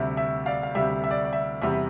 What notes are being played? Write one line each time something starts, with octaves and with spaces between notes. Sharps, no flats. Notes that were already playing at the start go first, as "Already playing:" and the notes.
Already playing: D2 C3 G3 E5
E5
D5 F5
F5
D2 C3 G3 E5
E5
D5
D5
E5
E2 C3 G3 E5